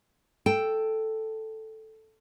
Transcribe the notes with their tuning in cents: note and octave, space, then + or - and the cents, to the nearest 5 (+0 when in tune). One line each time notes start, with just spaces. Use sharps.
A4 +0 G5 +0